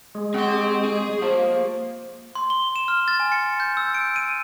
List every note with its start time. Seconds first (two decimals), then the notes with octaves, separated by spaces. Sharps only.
0.15 G#3
0.34 C4 C#5 D#5 F#5 C6
0.47 G4
0.85 G#4
1.22 F3 A#3
2.35 C6
2.50 G7
2.76 E7
2.88 F6
3.08 A6
3.20 G#5
3.32 C#7
3.60 G6
3.77 E6
3.94 D7
4.16 D#7